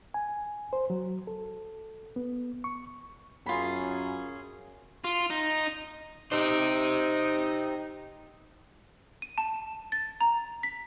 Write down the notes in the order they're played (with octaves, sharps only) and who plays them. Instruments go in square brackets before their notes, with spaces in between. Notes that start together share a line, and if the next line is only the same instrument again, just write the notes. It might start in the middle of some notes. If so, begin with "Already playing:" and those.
[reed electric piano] G#5
C5
F#3
A4
B3
C#6
[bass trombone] F#2 [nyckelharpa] C#4 G#4 [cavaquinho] F4 B5
[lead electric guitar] F4
D#4
[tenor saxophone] D#4 [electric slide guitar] G4 C5
[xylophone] D#7
A5
A6
A#5
B6